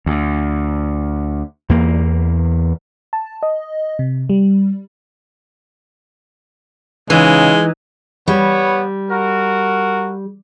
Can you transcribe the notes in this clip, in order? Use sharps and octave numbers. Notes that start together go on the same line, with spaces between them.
D2
E2 A#3
A5
D#5
C3
G3
C#3 E3 G#3 D#4
G3 B3 C#5
F#4 A#4